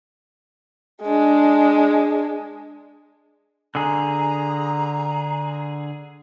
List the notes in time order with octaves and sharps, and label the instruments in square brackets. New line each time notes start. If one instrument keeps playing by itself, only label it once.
[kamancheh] G#3 D4
[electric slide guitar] D3 G#4 [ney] A#5